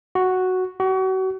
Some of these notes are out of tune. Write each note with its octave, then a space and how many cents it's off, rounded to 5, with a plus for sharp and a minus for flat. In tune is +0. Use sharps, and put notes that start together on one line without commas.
F#4 +0
F#4 +35